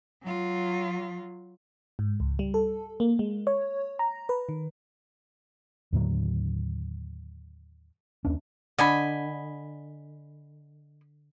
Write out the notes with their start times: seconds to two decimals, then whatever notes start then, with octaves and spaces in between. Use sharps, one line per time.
0.23 F#3 F4
1.99 G#2
2.20 C#2
2.39 G3
2.54 A4
3.00 A#3
3.19 G#3
3.47 C#5
3.99 A#5
4.29 B4
4.49 D#3
5.93 D#2 A2 D3 F#3
8.25 D#2 C#4 D4
8.78 D3 D#5 G#5 B5